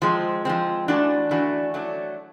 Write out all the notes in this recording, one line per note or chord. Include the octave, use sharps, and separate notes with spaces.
F3 G#3 C4
F3 G#3 C4
E3 A3 D4 F#4
E3 A3 D4 F#4
F#3 A3 D4